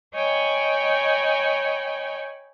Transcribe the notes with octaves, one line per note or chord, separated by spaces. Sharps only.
C#5 D#5 G5 G#5 B5